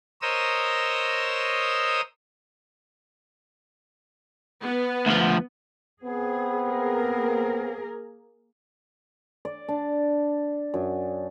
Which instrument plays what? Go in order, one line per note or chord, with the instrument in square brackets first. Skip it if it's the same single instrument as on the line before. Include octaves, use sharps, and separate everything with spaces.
[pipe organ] A#4 C5 C#5 D#5 D#6 E6
[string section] B3
[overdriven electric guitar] D2 F3
[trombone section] B3 C4 [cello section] G#4
[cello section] A#3 G#4 A#4
[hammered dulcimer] D5
D4
F#2